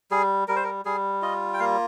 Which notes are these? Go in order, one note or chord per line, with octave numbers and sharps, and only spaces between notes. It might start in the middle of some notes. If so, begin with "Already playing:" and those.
G3 G#4
G3 A#4
C5
A#4
G3 G#4
F4 D#5
G5
A#3 F5